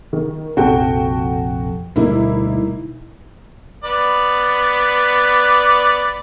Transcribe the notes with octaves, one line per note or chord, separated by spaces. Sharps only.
D#3
A#1 F2 C3 F#4 A4 G5
D2 B2 G3 A#3 D#4 E4
B3 D5